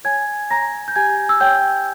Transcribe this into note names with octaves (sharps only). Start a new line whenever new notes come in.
C#5 G#5 G#6
C#5 A#5 A#6
G6
G4 G#5 G#6
E6
C#5 G5 G6